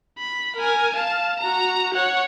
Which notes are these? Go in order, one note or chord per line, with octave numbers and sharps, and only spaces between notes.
B5
A#4 G#5
F5 A5
F#4 A#5
C#5 F#5